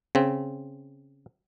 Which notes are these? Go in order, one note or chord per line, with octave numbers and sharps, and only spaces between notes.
C#3 C4